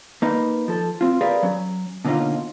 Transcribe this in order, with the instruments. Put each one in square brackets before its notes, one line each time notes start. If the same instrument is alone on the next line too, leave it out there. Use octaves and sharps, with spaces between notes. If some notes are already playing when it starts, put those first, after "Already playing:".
[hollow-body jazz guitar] A#3 D#4 B4
F3 A4
C4 F4
G4 G#4 A#4 B4 D5 F5
F#3 C#4
B2 D3 A#3 C#4 D#4 F4